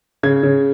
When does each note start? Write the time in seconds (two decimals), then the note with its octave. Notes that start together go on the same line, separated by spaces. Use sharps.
0.23 C#3 G#6
0.43 C#3